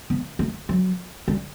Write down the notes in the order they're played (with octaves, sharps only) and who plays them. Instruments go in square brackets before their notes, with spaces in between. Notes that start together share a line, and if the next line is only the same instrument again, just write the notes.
[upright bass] B3
A3
F#3
G3